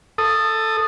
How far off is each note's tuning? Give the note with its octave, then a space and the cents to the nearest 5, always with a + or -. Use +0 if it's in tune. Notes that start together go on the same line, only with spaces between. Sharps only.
A4 +10 D#6 -10